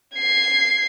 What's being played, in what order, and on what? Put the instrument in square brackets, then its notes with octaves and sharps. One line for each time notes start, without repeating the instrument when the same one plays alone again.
[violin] G#6 C7